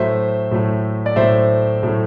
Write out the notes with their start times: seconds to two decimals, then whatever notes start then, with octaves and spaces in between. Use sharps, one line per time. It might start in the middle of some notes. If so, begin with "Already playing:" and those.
Already playing: A2 F#3 A3 C5 E5
0.51 A2 F#3 A3
1.06 D5
1.16 A2 F#3 A3 C5 E5
1.83 A2 F#3 A3